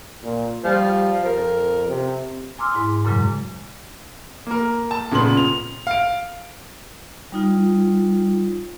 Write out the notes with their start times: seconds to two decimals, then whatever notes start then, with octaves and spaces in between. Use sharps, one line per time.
0.23 A#2
0.64 F3 G3
1.25 F2 A#4
1.89 C3
2.58 G#5 A#5 C6 D6 E6 F6
2.71 G#2 E4 G#5 C6
3.05 F#2 A#2 C#3 F#3 G#3
4.47 A#3 A#4
4.91 A5
5.11 A#2 C#3 B3 C6 F#7
5.37 F7
5.87 F5 D7
7.32 G3 D#4 F4